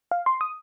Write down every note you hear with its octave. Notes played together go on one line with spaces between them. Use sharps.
F5
C6
D#6